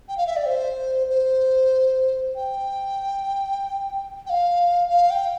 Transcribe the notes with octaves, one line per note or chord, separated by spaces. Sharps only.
G5
F5
E5
D5
C5
C5
G5
G5
F5
F5
G5